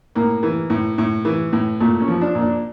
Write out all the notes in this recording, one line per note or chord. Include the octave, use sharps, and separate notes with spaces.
A2 A#3
E3
A2
A2
E3
A2
A#2 A3
C#4
F3
D4
A#2
D4